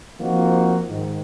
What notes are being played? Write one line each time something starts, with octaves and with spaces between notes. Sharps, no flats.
F3 A#3 C4 D#4 F4 F#4
G#2 D#3